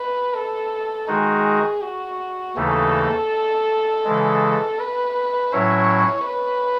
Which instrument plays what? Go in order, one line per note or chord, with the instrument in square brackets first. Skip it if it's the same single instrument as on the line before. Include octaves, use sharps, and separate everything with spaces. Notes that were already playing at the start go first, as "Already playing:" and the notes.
Already playing: [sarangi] B4
A4
[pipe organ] D#3 G#3 D#4 F#4 [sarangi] G#4
[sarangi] F#4
[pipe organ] D#2 C#3 E3 A3 D#4 [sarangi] A4
[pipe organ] C#3 E3 G#3
[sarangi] B4
[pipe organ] A2 F#3 C#4 E4 [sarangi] C#5
[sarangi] B4